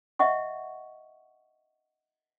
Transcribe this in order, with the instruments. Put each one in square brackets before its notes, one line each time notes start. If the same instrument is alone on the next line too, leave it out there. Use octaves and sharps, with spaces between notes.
[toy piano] D#5 E5 F#5 C#6